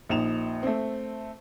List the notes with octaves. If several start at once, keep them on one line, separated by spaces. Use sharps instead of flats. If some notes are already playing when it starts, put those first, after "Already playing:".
A#1 D#4 E7 F7
A3 C4